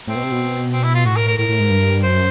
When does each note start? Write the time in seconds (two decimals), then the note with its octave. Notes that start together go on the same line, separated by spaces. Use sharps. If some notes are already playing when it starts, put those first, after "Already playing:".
0.08 A2 C4
0.15 B2
0.24 C3
0.32 B2
0.73 C4
0.83 E4
0.94 F4
1.05 A2 F#4
1.16 A#4
1.28 A#4
1.38 A2 A#4
1.49 A2
1.60 G#2
1.70 G2
2.03 F#2 C5